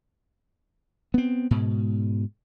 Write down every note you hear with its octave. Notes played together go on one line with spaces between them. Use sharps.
B3 C4
G#2 B2